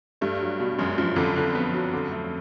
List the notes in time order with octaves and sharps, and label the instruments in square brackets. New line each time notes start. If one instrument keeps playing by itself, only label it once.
[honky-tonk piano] G2 [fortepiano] A3
[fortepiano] F#3
B2
[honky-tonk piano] F#2 [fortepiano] G#3
[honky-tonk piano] F#2 [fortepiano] F3
[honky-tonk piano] F2 [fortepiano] D3
[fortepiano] D3
B3
F#3
D3
A3